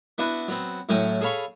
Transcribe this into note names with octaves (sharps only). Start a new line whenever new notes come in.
B3 D4 E4 F#4 B4
F#3 B3 C4
A2 F#3 A3 C#4 G5 D#6
G#4 A4 C#5 F5 B5 C#6